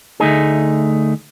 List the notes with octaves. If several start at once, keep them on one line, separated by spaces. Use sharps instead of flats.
D2 A3 D#4 G#4